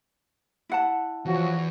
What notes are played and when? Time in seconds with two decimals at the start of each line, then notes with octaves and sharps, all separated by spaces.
0.69 E4 F#5 A5
1.25 E2 F3 F#3 F#4